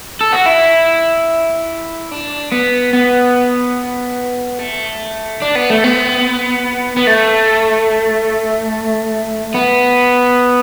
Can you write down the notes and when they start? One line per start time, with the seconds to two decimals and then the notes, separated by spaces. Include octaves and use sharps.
0.21 A4
0.33 F#4
0.46 E4
2.11 D4
2.52 B3
2.93 B3
4.59 A3
5.42 D4
5.55 B3
5.70 A3
5.84 B3
6.97 B3
7.07 A3
9.54 B3